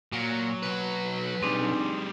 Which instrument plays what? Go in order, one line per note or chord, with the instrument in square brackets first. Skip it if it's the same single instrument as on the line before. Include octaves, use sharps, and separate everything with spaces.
[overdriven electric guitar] A#2 [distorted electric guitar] F#3
[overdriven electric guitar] B1 B4
[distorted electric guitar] G3 G#4 [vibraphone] C4 D4 D#4